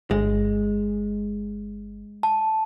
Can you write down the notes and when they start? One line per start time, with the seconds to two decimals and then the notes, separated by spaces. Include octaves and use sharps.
0.11 G1 G#3
2.23 A5